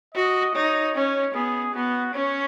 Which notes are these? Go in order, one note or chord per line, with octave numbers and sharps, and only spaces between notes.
F#4 D#5
D#4 C#5
C#4 C#5
B3 G#4
B3 F#4
C#4 C#5